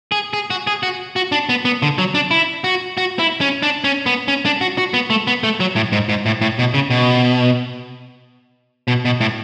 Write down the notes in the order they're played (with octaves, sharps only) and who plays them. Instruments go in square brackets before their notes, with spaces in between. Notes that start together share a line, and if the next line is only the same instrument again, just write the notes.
[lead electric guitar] G#4
G#4
F#4
G#4
F#4
F#4
D4
B3
B3
D3
F#3
D4
E4
F#4
F#4
E4
C#4
D4
C#4
B3
C#4
D4
F#4
F#4
B3
A3
B3
A3
F#3
A2
G#2
G#2
A2
A2
B2
C#3
B2
B2
B2
A2